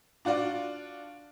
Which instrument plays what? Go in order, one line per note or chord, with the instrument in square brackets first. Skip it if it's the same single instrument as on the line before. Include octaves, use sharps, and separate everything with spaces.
[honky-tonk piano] D4 F4 F#4 D5